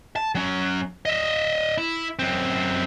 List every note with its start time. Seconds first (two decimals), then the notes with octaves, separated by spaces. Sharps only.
0.16 A5
0.35 F#3 C#4
1.05 D#5 E5
1.78 E4
2.19 F#2 C4